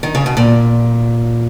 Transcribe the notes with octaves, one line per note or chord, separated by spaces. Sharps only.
D#3
C#3
B2
A#2